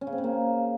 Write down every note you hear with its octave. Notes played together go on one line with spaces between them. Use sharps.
C#4
C#3
C4
C#3
A#3